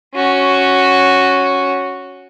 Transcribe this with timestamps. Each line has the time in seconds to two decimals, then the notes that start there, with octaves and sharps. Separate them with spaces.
0.15 C#4 F#4